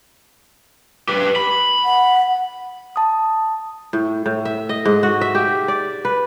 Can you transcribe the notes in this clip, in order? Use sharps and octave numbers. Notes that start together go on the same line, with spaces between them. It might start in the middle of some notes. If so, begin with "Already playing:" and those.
G4 B4
B5
F#5
A5 D#6
A2
A2
E5
D#5
G#2
F#4
E5
G4
D5
B4